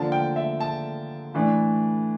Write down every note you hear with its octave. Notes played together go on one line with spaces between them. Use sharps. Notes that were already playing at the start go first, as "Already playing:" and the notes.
Already playing: D3 F3 A#3 D4 A5
G5
E5
A5
A2 E3 A3 D4